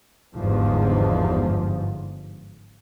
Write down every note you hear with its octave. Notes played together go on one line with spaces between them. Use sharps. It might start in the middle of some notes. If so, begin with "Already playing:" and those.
G1 E2 G#2 F3